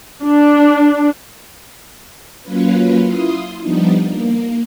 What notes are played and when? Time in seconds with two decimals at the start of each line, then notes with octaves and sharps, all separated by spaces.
0.23 D4
2.43 F#3 A#3 C#4 F4 B4
3.04 E4 F4 C6 D#6
3.60 F3 G3 B3 D4 D#4
4.02 A#3